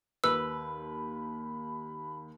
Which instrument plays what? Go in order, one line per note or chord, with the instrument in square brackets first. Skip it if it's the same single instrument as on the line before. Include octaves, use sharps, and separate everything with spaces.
[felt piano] D#2 [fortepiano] B4 [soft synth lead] B5 [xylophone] E6